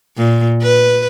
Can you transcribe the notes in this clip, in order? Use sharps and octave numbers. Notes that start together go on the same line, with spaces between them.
A#2
B4